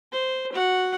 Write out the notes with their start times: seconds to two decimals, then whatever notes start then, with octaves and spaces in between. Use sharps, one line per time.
0.12 C5
0.53 F#4 F#5